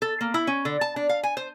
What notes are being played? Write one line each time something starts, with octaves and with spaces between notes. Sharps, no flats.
A4
A#3
E4
C#4
D3
A5
D4
F5
G#5
C5